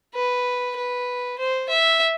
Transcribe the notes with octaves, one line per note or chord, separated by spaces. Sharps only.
B4
B4
C5
E5